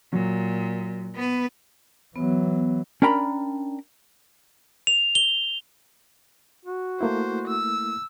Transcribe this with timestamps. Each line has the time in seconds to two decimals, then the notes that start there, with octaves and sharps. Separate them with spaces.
0.13 A#2 F#3
1.15 B3 B4
2.16 E3 F#3 B3
3.02 C#4 D4 A#4 G5 A#5 B5
4.87 F7
5.15 G7
6.65 F#4
7.01 A3 A#3 E4 C5
7.48 E6